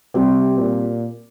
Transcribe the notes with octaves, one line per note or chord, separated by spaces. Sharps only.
C3 G3 C4 G4
A#2